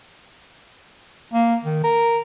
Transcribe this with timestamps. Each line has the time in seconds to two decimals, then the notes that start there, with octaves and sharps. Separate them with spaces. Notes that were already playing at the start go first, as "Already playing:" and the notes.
1.34 A#3
1.64 D#3
1.84 A#4